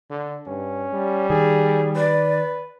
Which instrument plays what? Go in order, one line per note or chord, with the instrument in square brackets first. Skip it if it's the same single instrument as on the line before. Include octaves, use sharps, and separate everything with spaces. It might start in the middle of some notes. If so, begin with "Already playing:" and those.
[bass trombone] D3
[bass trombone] G2 [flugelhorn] C#4
[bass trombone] G3
[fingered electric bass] D#3 [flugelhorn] G#4
[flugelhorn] B4 [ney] D5